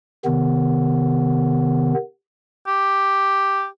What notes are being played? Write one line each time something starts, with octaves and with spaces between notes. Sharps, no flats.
C3 D#3 B3
G4